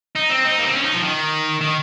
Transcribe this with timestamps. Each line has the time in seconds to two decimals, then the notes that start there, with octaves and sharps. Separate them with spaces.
0.15 D#4
0.29 C4
0.45 D#4
0.58 A#3
0.66 C4
0.74 C#4
0.84 D#4
0.93 F3
1.03 D#3
1.61 D#3